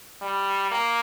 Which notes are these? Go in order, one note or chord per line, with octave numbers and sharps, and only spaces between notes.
G3
A#3